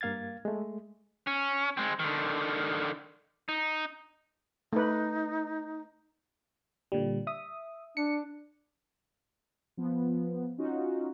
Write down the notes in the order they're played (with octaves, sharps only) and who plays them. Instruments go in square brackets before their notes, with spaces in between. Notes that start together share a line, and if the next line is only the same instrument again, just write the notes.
[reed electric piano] G2 A#3 F5 G#6 A6
G#3 A3
[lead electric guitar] C#4
G#3 C4
D3 D#3
D#4
[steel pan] A3 B4 [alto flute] D#4
[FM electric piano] A#2 D3 G3
E5 D#6
[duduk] D4 [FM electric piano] C#7
[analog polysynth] F3 B3
C#4 D#4 F4 F#4